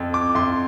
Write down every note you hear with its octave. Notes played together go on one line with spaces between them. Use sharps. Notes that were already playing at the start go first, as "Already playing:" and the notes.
Already playing: F2
D6
F2 C6